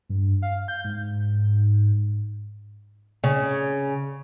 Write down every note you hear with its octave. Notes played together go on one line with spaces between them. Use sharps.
G2
F5
G6
G#2
C#3